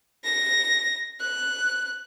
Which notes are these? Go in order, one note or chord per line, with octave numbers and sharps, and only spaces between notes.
A#6
F#6